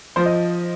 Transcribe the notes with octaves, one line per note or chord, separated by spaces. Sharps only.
F3 C5
D#5